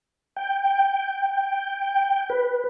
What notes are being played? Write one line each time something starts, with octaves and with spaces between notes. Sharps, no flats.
G5
B4